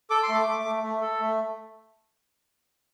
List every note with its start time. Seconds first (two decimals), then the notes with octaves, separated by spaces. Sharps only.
0.10 A4 D6
0.23 C6
0.29 A3
0.34 D6
0.47 A3
0.65 A3
0.83 A3
1.01 A4
1.20 A3